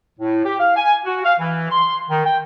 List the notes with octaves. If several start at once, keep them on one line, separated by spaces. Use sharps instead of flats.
A2
G4
F5
G#5
F#4
F5
E3
C6
D#3
G5